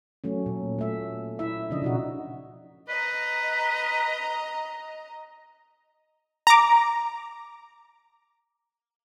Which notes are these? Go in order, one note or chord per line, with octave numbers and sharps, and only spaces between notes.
F#3 A3 C#4
A#2
A3 E5
E4 E5
C#3 F3 D4 D#5
B2 D#4 F#4
B4 D#5 A#5
A#5 D6